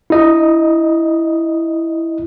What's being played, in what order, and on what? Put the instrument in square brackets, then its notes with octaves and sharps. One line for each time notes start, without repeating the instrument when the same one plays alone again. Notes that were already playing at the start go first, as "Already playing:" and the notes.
[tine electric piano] E4 D#5